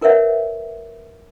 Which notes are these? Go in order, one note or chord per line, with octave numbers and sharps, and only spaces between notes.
E4 A#4 B4 C#5 E5 F#5